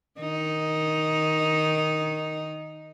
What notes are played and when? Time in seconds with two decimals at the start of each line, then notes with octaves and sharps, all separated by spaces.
0.20 D#3 D#4